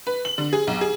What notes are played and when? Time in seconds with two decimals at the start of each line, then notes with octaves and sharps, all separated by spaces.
0.07 B4
0.25 F#7
0.38 D3
0.53 G#4
0.67 B1
0.81 G#4